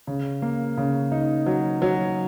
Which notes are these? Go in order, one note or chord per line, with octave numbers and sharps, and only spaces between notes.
C#3
A#3
C#3
D#4
F#3
F#3